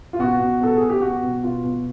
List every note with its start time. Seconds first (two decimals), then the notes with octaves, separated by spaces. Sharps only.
0.13 F4
0.19 B2 F#4
0.40 B2
0.60 B2 A4
0.76 G#4
0.82 B2
0.90 G4
1.01 B2 F#4
1.23 B2
1.43 B2 F4
1.64 B2